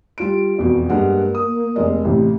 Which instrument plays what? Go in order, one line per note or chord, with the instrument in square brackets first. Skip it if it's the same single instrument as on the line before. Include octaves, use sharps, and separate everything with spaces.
[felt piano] G3 F4 D7
E1 F2 B2
[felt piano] G2 G#3 F#5 [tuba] A#3
[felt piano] D#6
F1 G#3 D#5
A1 A2 C3